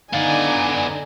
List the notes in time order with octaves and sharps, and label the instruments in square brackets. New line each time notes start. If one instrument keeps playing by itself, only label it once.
[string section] D3 D#4 [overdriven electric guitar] B3 D5 [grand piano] F5 [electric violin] G#5